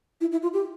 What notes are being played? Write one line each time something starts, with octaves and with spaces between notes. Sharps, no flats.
E4
E4
F4
G4